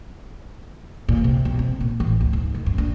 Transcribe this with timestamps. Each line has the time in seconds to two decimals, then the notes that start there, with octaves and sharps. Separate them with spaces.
1.09 A#2
1.24 C3
1.45 B1
1.59 C4
1.80 A#2
2.00 A1
2.21 D2
2.33 G#2
2.54 D3
2.66 G2
2.78 D4